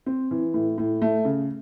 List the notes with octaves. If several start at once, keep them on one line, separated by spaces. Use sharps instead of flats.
C4
E3
A2
A2
A3
C#3